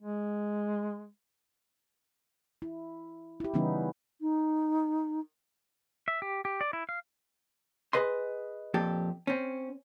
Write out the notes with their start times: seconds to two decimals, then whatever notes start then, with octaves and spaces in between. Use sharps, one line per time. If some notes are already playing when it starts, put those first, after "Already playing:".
0.02 G#3
2.62 E4
3.40 E4 G4
3.54 C#3 E3 G3 B3 C#4 D#4
4.21 D#4
6.08 E5
6.22 G4
6.45 G4
6.61 D5
6.73 E4
6.89 F5
7.93 G#4 B4 D#5 C6
8.74 F2 A#2 G4 A4
9.27 C4 C#4